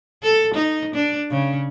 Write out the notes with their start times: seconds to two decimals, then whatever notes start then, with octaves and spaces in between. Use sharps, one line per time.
0.23 A4
0.54 D#4
0.95 D4
1.31 C#3